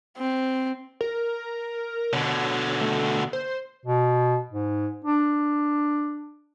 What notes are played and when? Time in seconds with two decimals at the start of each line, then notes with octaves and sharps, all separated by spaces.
0.18 C4
1.01 A#4
2.13 B2 D3 C#5
2.81 A3
3.33 C5
3.86 B2
4.51 G#2
5.05 D4